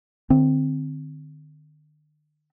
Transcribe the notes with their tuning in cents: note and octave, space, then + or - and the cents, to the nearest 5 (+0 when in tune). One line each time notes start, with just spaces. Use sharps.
D3 +45 C4 +0